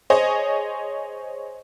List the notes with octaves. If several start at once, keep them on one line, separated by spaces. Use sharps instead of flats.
G#4 C5 C#5 D#5